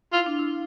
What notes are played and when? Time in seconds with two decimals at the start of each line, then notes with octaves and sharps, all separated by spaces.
0.13 E4 F4
0.26 D4
0.39 E4